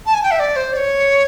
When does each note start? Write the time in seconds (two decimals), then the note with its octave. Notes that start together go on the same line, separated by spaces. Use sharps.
0.06 A5
0.14 G#5
0.23 G5
0.31 E5
0.39 D5
0.56 C5
0.73 D5
0.76 C#5